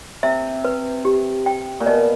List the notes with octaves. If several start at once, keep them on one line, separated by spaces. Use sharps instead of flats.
C3 E5
B4
G4
G5
A#2
B2 D#5